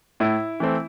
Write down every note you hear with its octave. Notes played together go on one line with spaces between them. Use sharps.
A2 E4
E3 A3 C4